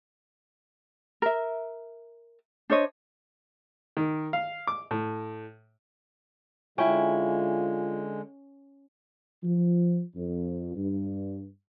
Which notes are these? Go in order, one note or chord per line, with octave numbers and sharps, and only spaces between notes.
A#4 E5
D4 C5 C#5 D#5
D#3
F5
D6
A2
D3 G#3 C#4 E4 F4 G5
F3
F2
G2